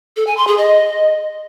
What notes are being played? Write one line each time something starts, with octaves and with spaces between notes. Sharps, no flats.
A4
G#5
C6
G#4
D#5